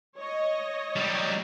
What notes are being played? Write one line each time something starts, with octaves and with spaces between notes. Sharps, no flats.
C#5 D#5
F#3 G3